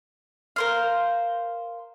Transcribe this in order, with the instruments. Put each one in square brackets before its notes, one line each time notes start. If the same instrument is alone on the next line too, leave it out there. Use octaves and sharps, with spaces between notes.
[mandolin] A#4 C5 F5